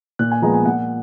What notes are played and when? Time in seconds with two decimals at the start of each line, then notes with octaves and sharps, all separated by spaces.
0.19 A#2 F#6
0.32 G#5
0.42 F3 G#3 B3 A#5
0.54 G#5
0.65 A#2 F#5